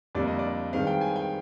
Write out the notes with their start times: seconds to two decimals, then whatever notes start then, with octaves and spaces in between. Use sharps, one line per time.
0.15 F2 D3 G3 A#3 D5
0.27 D#5
0.39 D5
0.73 G2 D#3 G#3 C4 F5
0.87 G5
1.01 G#5
1.16 G5